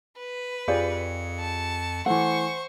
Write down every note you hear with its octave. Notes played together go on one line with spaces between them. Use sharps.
B4
F2 F4 G4 G#4 C5 D5 C#7
A5
E3 A3 C5 F#5 C#6